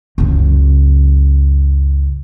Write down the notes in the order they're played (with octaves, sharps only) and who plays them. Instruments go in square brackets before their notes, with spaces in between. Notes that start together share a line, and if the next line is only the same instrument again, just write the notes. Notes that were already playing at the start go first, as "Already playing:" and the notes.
[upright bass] C#2 F#2